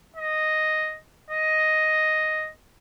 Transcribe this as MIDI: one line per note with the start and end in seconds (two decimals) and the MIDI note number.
0.16 0.99 75
1.30 2.51 75